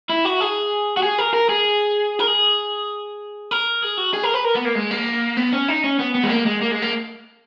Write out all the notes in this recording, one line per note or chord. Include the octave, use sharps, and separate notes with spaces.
E4
F#4
G#4
F#4
G#4
A#4
A#4
G#4
A#4
G#4
A#4
G#4
F#4
G#4
A#4
B4
A#4
B3
A#3
G#3
A#3
B3
C#4
D#4
C#4
B3
B3
G#3
A#3
G#3
A#3
G#3
A#3